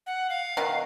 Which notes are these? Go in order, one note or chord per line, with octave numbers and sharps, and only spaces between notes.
F#5
F5
B2 D#3